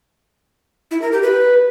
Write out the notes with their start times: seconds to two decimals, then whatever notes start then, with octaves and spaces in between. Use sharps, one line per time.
0.91 E4
1.02 A#4
1.12 G4
1.23 B4